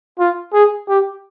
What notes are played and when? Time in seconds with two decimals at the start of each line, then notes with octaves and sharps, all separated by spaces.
0.19 F4
0.53 G#4
0.89 G4